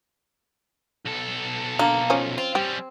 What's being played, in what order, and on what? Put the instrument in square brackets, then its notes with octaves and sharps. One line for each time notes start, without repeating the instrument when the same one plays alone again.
[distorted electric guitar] B1 A4
[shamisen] D3 [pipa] A#3
[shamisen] F3 C#4
[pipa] C4 [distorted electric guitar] F4
[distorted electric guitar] G3 C#4 [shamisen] G4